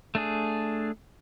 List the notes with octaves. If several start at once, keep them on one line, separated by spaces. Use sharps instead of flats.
A3 D4 G#4